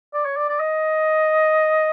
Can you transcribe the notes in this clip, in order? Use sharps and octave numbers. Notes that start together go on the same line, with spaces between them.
D5
C#5
D5
D5
D#5